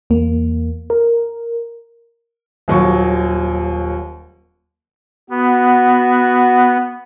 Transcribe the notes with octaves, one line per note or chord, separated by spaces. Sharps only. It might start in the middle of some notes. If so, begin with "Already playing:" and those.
E2 A#3
A#4
D#1 D#2 F#3 C#6
B3 F#4